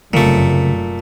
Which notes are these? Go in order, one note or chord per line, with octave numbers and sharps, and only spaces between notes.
F1 F#2 A#2 C#3 A3